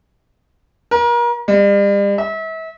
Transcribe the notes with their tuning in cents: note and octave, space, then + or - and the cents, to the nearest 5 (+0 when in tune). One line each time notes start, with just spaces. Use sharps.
A#4 +35
G3 +40
E5 -35